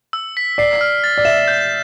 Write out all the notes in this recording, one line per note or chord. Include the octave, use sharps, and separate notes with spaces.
E6
B6
D5 C7
F6
A6
D5
E5 E7
G6